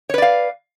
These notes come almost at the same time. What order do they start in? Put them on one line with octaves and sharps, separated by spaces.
C#5 B4 D5 F5